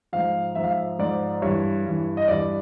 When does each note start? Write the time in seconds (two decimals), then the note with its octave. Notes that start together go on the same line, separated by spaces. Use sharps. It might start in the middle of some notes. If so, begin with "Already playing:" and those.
0.13 G#2 F3 F5
0.55 G#2 F3 E5
0.64 F5
0.71 E5
0.99 G#2 F3 D5
1.42 G2 E3 C#5
1.85 G2 E3
2.17 D#5
2.28 G2 E3 D5